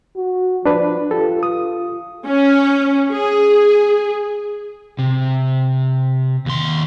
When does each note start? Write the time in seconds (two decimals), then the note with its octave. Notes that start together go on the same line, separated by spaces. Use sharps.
0.16 F#4
0.65 F3 D4 B4
1.11 F4 G4 A4
1.43 D#6
2.26 C#4
3.12 G#4
4.99 C3
6.46 D#2 C6